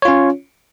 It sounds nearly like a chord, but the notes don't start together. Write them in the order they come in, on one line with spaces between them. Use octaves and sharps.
C#5 F4 C#4